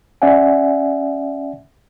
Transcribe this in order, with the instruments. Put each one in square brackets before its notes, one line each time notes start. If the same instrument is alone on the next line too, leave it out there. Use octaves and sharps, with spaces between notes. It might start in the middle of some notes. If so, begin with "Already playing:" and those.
[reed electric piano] C#4 D5 E5 F#5 G#5